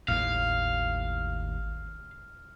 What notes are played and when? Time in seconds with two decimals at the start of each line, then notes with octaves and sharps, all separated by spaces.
0.08 G#1 D#2 A2 F5 F6